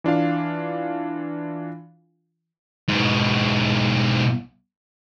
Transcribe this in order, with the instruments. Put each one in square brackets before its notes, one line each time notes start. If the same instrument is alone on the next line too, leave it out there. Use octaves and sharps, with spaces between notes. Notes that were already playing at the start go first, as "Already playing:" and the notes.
[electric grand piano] E3 D4 F4 F5
[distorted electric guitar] G#2 B2